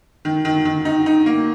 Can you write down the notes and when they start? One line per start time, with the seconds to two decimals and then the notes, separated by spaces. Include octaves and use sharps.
0.25 D#3
0.45 D#3
0.65 D#3
0.85 D#4
1.06 D#4
1.26 A#3